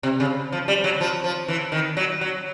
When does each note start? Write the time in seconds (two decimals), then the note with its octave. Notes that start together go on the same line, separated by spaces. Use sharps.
0.03 C3
0.20 C#3
0.52 F3
0.68 G3
0.84 F#3
1.01 F3
1.24 F3
1.48 E3
1.72 D#3
1.97 F#3
2.21 F#3